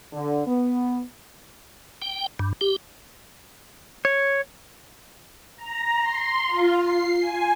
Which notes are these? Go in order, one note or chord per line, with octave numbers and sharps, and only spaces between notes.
D3
B3
G5
G2
G4
C#5
A#5
C6
F4
C7
G#5